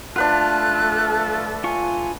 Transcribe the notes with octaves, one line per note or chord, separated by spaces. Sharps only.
A3 D4 F4 A4 B4 F#5 F#6
F4 G#5 C#6